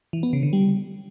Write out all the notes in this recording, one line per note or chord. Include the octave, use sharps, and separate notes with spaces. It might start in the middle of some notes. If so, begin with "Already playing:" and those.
E3
B3
C#3
D3
G3